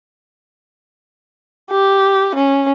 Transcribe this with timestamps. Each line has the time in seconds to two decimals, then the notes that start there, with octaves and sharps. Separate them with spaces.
1.71 G4
2.35 C#4